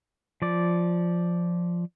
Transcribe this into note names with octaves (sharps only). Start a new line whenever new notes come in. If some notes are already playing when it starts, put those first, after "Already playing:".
F3 D5